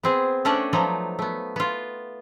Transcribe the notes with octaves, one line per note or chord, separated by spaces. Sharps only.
B3 C4 G#4
A3 C#4 D4 D5 F#5 G5
F3 F#3 B3 D#4 D5
A3 B3
B3 F4